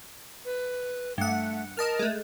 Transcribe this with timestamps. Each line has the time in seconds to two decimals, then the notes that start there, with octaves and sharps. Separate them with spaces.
0.45 B4
1.18 G2 A3 F#5
1.77 A#4 D#5 A5 F6
1.99 G#3 A3